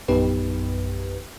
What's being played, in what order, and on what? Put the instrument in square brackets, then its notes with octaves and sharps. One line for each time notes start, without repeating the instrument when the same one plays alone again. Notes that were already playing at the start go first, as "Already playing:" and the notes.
[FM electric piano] A#1 F#2 B3 D#4 G4 B4